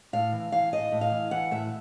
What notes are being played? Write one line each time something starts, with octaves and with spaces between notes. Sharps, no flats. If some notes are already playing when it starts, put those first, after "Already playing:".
A2 F5
E3
E3 F5
A2 D#5
A2
F5
E3
E3 F#5
A2 E5